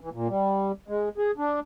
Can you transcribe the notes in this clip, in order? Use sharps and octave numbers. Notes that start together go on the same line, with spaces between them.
E3
A#2
G3
G#3
G#4
D4